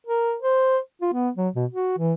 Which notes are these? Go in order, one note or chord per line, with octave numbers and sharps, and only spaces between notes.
A#4
C5
F4
B3
F#3
B2
F#4
E3